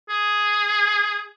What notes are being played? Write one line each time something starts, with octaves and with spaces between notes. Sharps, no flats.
G#4